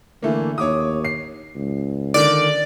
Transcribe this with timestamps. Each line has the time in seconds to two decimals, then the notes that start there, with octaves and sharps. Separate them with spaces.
0.22 D3 E3 A3 A#3
0.58 D#2 C#5 D6 D#6
1.05 C7
1.55 C#2
2.14 D3 D#3 D5